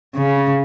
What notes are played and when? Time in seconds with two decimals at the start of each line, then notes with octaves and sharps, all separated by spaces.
0.16 C#3